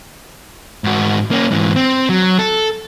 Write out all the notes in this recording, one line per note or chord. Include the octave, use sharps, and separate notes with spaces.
G#2 F#4
A#3 C#4
G#2 E3
C4
F#3
A4